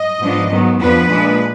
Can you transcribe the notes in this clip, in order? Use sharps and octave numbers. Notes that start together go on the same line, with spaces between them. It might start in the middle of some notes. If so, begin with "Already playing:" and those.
Already playing: D#5
G#2 F3 B3 D4
G#2 D#3 F#3 B3
F2 F3 B3 D4 B4
A#2 G#3 D4